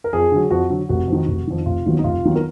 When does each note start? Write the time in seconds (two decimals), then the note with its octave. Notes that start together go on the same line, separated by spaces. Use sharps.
0.04 A#4
0.13 F2 G#4
0.32 D3 F#3
0.51 F2 F#4
0.70 D3 F#3
0.89 F1 F#4
1.08 F2 D#3
1.28 F1
1.47 F2 D#3
1.66 F1 F4
1.86 D#2 D#3 F#3 B3
1.99 D#4
2.04 F1 F4
2.24 D#2 D#3 F#3 B3
2.35 A#4